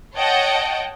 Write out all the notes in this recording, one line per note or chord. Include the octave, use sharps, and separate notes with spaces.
C#5 D#5 F#5 G5 A5